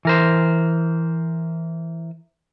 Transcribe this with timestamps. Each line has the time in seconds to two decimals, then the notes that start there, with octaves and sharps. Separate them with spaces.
0.05 E3 A#4 C5